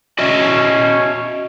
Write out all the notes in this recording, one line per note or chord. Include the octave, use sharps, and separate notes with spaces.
C#4 F#4 D#5 E5